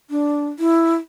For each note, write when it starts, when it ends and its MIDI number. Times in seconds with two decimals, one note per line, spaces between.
0.10 0.47 62
0.59 0.95 64